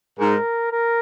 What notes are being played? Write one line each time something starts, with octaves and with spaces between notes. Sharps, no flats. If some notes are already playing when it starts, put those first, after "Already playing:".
G#2 A#4
A#4